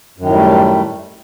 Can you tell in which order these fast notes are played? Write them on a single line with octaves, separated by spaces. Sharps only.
F#2 D#3 A2 G3 A3